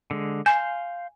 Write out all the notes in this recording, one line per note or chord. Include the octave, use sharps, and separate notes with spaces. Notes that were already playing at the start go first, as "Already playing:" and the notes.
D3 G#3
F5 G#5 C6 G6